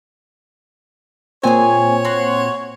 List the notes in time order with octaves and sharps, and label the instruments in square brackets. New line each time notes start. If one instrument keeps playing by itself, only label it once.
[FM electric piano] A#2 C4 [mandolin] G#4 G#5 [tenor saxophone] C#5
[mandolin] F#4 C6